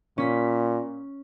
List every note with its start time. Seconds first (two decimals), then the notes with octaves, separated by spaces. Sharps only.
0.18 A#2 C#4 B6